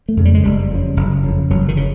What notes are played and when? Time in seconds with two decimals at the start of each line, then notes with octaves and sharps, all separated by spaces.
0.09 A3
0.17 F2 C#3
0.25 G3
0.35 G#3
0.44 F#1 G3
0.71 F2 C#3
0.97 F#1
1.24 F2 C#3
1.50 F#1 F#3
1.68 D#3
1.77 C#3